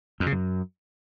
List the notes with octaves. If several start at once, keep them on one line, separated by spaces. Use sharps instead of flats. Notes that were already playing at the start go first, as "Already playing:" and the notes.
F2
C#3
F#2